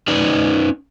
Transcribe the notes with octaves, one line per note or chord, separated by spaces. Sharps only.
C#4 D#4 B4 D5